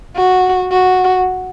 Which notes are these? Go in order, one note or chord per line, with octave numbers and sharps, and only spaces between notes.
F#4
F#4